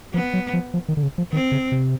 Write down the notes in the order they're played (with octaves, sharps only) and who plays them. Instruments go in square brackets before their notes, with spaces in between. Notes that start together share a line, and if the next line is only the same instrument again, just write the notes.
[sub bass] F3 [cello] B3
[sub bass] F#3
F3
F3
D#3
D3
C#3
F3
[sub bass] D#3 [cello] C4
[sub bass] C#3
C3